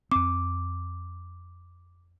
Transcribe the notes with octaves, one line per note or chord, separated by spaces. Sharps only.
F2 C4 D6